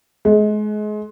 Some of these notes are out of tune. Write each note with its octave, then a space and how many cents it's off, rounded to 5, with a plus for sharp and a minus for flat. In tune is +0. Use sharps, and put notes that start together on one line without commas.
G#3 +30